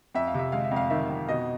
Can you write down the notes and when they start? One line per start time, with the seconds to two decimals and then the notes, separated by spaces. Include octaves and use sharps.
0.15 F2 E5
0.27 F5
0.34 C3 E5
0.52 G#3 F5
0.65 E5
0.71 F2
0.76 F5
0.90 D#3 E5
1.10 F2
1.29 B2 D#5